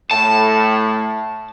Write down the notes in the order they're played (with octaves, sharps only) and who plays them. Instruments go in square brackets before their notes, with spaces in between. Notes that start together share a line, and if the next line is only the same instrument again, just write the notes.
[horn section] A2 [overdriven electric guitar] A5